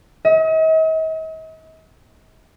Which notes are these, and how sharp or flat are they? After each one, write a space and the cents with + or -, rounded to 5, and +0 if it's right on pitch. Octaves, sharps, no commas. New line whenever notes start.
D#5 +45